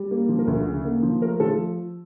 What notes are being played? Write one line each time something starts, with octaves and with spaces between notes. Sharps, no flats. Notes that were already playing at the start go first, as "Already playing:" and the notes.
Already playing: G3
A#3
F3
A#4
D2
C#3
A#3
F3
A3 A#4
F3 A4